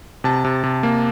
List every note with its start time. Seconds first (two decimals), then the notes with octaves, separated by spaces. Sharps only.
0.24 C3 A5
0.45 C3
0.64 C3
0.83 A#3